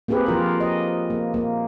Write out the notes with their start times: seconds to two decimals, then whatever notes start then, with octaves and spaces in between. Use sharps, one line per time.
0.08 A#3 C4 G4 G#4 B4
0.26 F3 F4 A#4
0.60 D#5
1.10 A#3
1.34 A#3